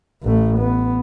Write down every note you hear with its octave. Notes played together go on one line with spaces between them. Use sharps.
A1 A3
B3